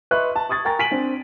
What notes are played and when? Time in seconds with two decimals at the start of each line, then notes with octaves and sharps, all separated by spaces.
0.11 B4 D#5 E5 C6 C#6 F#6
0.36 A5
0.49 C#6 D#6 G#6 A6
0.65 A#4 G5 G#5 A#5 C#6 A6
0.79 G#5 B6 D7 D#7 F#7
0.91 C4 D4